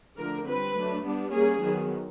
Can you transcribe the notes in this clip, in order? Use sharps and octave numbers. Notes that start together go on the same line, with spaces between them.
D3 F3 A3 D4 A#4
G3 C4 B4
F#3 A3 D4
G3 B3 D4
G3 A#3 C#4 G#4
D#3 F#3 B3